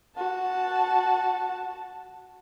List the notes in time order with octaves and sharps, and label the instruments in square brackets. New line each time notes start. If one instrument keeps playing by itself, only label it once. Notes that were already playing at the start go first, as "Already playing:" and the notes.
[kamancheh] F#4 A5